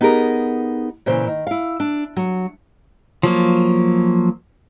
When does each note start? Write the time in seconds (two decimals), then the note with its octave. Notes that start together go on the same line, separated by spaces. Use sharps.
0.01 B3 D#4 G4 G#4 A#4
1.06 A#2 C#3 E3 C5
1.27 D#3
1.47 E4 F5
1.80 D4
2.16 F#3
3.23 F3 F#3 A#3